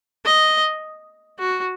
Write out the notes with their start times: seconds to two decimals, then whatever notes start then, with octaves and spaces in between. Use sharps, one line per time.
0.25 D#5
1.39 F#4